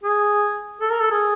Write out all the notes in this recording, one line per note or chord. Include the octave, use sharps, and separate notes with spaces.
G#4
A4
A#4
A4
G#4